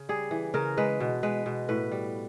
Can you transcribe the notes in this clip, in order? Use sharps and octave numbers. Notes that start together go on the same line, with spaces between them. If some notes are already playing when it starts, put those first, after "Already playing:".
Already playing: C#3
G3 G#4
E3
C#3 A#4
G#3 B4
B2
G#3 B4
B2
A2 B4
G3